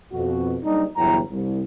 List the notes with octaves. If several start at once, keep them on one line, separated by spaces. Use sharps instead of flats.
F2 B2 F#4
F#1 G3 D4 D#4
G1 E2 F#3 E4 G5 A#5
C2